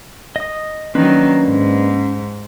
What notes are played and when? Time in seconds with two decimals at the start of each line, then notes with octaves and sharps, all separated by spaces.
0.36 D#5 D#6
0.95 D#3 F#3 A#3 C#4 D4 B4
1.46 G#2